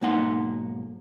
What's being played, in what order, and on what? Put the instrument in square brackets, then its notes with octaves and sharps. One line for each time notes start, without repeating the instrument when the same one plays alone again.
[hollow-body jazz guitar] B1 G#2 A#3 D#4 F#5 C6